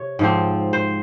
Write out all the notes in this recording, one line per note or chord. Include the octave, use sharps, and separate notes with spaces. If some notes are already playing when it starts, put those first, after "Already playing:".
Already playing: C3 C#5
G#2 F3 C4
C5